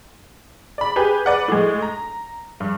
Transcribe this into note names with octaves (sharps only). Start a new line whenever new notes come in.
D5 B5
G4 G#4 B4
B4 D5 F#5
A2 G#3
A#5
G2